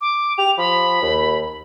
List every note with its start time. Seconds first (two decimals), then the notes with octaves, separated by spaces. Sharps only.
0.01 D6
0.38 G4 F7
0.58 F3 B5
1.02 D#2